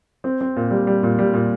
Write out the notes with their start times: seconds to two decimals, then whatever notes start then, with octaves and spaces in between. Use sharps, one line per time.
0.24 C4
0.41 C4
0.56 A#2
0.71 G3
0.87 G3
1.03 A#2
1.19 G3
1.33 A#2